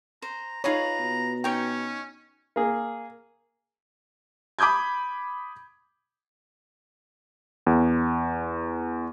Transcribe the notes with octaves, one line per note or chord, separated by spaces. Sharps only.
C5 A#5
D#4 F4 G#4 B4 C#5 A#5
B2
C#4 D#4 C#5 G5
A#3 G#4
B5 D6 D#6 G6 G#6
E2